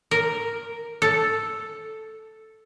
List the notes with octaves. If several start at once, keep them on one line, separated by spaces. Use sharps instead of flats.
A#4
A4